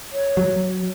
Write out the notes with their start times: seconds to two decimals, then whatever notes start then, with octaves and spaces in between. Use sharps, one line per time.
0.13 C#5
0.37 F#3